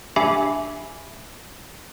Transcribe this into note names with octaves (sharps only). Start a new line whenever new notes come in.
D4 G4 E5 G#5 B5 C7